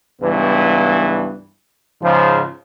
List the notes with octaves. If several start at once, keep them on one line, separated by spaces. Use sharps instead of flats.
C#2 G2 E3 B3
G#2 C#3 F3